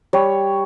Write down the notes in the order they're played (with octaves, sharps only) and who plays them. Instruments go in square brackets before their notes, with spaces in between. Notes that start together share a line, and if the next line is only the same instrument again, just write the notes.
[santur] G3 C#5